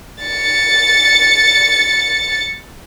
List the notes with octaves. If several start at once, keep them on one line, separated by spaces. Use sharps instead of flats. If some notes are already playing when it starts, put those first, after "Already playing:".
A6 C#7